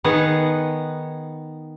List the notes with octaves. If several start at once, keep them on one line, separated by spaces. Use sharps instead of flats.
D#3 B3 G#4 F#5